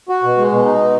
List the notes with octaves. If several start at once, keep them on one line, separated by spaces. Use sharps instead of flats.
F#4
B2
G#3
B2
D#4
B2